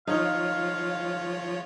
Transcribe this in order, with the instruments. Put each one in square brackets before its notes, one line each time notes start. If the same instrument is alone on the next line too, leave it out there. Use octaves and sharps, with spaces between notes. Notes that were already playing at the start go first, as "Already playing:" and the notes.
[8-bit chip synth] F3 F4 C#5 [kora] D#4 [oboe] F5